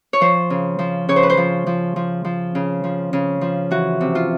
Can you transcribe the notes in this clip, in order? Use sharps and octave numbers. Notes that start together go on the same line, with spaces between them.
C#5
F3 C5
C#3
F3
C#3 C#5
C5
B4
C5
F3
F3
F3
F3
C#3
F3
C#3
F3
E3 F#4
C3
F4